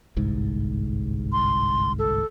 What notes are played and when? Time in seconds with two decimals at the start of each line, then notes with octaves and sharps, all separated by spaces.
0.16 G1 C2 G#2
1.32 C6
1.99 A4